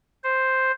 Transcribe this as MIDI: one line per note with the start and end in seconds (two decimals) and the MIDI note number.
0.24 0.71 72